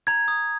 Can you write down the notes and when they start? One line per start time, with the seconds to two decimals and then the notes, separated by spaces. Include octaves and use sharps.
0.07 A#5 G#6
0.28 D#6